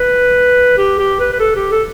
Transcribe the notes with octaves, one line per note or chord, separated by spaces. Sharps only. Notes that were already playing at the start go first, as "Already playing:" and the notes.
Already playing: B4
G4
G4
B4
B4
A4
G4
A4